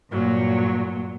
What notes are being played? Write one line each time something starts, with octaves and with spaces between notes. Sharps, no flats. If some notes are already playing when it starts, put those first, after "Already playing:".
G2 A#2 F#3